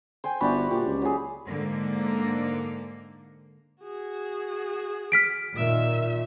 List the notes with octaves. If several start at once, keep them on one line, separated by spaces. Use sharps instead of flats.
C5 G5 G#5
G1 F#4 D5 E5 B5
A#2 G4
C#2
F#3 G#4
G#2 D3 A#3
F#4 G#4
F6 B6 D7
A#2 D#3 E5